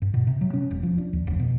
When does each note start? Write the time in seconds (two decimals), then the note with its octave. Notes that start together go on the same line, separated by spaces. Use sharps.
0.02 G2
0.14 B2
0.27 C3
0.41 F#3
0.53 C#4
0.71 E1
0.83 F3
0.98 D4
1.13 D#2
1.27 F1
1.39 B2